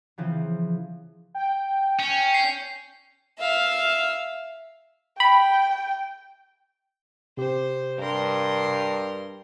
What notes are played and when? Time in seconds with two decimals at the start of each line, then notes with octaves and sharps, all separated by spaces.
0.18 C#3 E3 F3 C4
1.35 G5
1.99 C#4
2.34 C7
3.39 E5 F5
5.20 G5 B5
7.37 C3 G4 C5
7.99 G2 A#4 C6